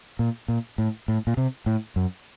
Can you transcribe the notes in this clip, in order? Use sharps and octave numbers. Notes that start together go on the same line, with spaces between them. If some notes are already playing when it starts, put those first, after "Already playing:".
A#2
A#2
A2
A2
A#2
C3
A2
F#2